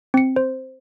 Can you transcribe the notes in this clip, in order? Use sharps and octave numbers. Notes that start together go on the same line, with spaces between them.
C4 C#7
C5